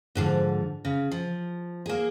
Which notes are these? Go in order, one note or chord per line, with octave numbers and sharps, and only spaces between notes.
G#2 D3 F3
C#3
F3
A#3 G#4